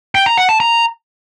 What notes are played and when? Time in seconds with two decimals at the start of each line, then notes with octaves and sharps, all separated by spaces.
0.15 G5
0.26 A#5
0.38 F#5
0.49 A5
0.60 A#5